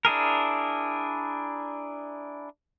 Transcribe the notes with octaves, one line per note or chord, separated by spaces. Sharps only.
D4 E4 G#4 A#4